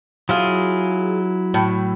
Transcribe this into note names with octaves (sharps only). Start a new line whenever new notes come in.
F#3 E4 F4 G#4 F6
A2